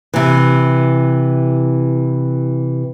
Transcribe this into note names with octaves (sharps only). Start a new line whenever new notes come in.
C3 E3